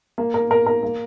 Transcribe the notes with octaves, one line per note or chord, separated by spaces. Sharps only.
A#3
A#4
A#4
A#4
A#3